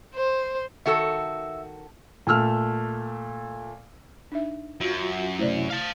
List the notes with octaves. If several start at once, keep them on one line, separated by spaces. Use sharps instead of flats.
C5
D#3 F#4 A4 E5 E6
A#2 A3 E6 F6
D4 D#4 E5
F#2 F4 F#4
C3 A3 E4 C5 D5
F5 A5